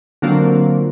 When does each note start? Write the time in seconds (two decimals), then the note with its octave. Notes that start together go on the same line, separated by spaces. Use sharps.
0.22 D3 F#3 A#3 C4 F4